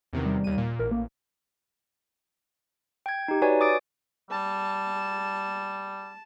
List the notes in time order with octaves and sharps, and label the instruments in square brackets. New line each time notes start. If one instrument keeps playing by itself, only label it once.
[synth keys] E2 C3 D#3
[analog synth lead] G3
[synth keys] D#2 D#7
A#2
[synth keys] A1 [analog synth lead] A#4
[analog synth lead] A#3
[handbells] G5 G#6
D#4 G4
F#4 B4 C#5 D5 G#5
D6 D#6 A6 D7
[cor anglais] G3 [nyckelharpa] A5